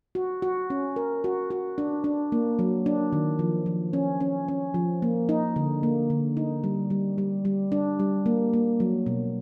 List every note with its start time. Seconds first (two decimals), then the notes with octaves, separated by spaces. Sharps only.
0.15 F#4
0.42 F#4
0.70 C#4
0.96 A#4
1.24 F#4
1.51 F#4
1.78 D4
2.04 D4
2.32 A#3
2.59 F#3
2.86 D4
3.13 D#3
3.39 F3
3.66 F3
3.93 C#4
4.21 C#4
4.48 C#4
4.74 F3
5.02 A#3
5.29 D#4
5.56 D3
5.83 A#3
6.10 D3
6.37 D#4
6.64 G3
6.90 G3
7.18 G3
7.45 G3
7.72 D4
8.00 G3
8.26 A#3
8.53 A#3
8.80 F#3
9.06 B2